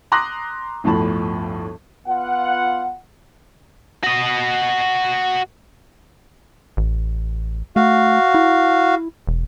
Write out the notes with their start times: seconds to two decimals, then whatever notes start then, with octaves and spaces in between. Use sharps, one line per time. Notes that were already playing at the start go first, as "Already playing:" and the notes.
0.12 A#5 C6 D6 D#6 F#6 A#6
0.84 G1 D2 A2 F3 A5 B5
2.07 B3 F4 F#5
4.04 F#4 D#5
6.77 A1
7.76 A3 F#4 F5
8.35 E4
9.27 E1